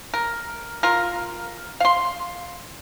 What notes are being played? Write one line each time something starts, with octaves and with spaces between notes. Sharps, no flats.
A#4
F4 A#4
F5 C6